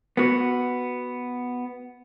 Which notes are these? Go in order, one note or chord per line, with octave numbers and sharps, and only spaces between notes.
B3 F#4